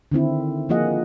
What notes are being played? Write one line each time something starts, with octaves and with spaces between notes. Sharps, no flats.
D3 D#3 C4 E4
F3 A#3 F4 G#4 D#5 F#5